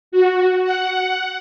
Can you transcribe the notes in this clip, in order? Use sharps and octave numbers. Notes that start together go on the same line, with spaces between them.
F#4
F#5